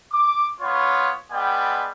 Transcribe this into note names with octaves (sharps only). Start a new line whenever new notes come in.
D6
B3 F4 C#5
G3 G#3 B3 D5 G5